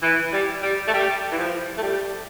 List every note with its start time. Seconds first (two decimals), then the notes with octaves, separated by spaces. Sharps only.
0.02 E3
0.32 G3
0.62 G3
0.87 A3
0.93 G3
1.32 E3
1.37 F3
1.77 A3
1.83 G3